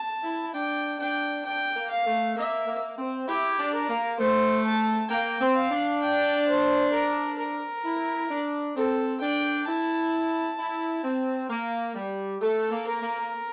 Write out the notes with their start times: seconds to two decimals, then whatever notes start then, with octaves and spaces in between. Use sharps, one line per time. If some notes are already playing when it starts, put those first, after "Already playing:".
Already playing: A5
0.24 E4
0.54 D4 G5
1.00 D4 G5
1.45 D4 G5
1.76 A#3
1.91 F5
2.06 A3
2.37 A#3 E5
2.67 A#3
2.98 C4
3.28 E4 G4
3.58 D4
3.74 A#4
3.89 A#3
4.19 A3 C5
4.65 A5
5.10 A#3 G5
5.41 C4
5.56 F5
5.71 D4
6.02 G5
6.48 C5
6.93 A#4
7.38 A#4
7.84 E4
8.30 D4
8.76 C4 A4
9.21 D4 G5
9.67 E4 A5
10.59 E4
11.04 C4
11.50 A#3
11.95 G3
12.41 A3 A4
12.71 A#3
12.87 A#4
13.02 A#3